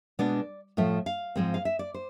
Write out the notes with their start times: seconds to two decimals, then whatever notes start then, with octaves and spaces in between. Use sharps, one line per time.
0.19 B2 G#3 B3 D4 D5
0.77 A2 F3 A3 E5
1.06 F5
1.36 G#2 F3 G#3 C4
1.54 F5
1.65 E5
1.79 D5
1.94 C5